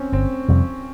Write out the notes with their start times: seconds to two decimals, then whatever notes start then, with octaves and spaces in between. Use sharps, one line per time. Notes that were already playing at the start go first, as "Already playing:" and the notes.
Already playing: C4 C#4
0.12 G1 C4
0.48 F2 C3 G3